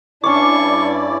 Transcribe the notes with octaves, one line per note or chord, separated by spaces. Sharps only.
G2 C#4 D4 E4 C#5 D5 C#6 D6